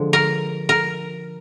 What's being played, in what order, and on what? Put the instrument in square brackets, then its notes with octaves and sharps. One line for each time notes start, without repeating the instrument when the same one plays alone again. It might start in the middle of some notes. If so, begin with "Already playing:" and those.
Already playing: [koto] D3 F3 G#3
A#4
A#4